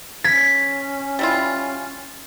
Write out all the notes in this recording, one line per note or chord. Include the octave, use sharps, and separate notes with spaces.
C#4 G#6 B6
G3 E4 F4